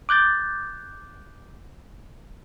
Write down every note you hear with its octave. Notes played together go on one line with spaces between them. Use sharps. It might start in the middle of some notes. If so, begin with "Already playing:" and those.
D6 F#6 G6 A6